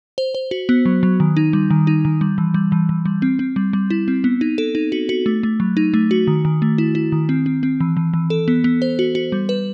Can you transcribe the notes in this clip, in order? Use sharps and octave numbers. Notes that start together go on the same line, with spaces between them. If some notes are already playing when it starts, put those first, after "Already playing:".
C5
C5
F#4
B3
F#3
F#3
D#3
D#4
G3
D#3
D#4
D#3
G3
E3
G3
E3
E3
G3
C4
C4
G3
G3
E4
C4
B3
D#4
A4
D#4
F#4
F#4
A3
A3
F#3
D#4
A3
F#4
D#3
D#3
A3
E4
E4
D#3
C4
C4
C4
E3
E3
E3
A4
B3
B3
C5
F#4
F#4
G3
B4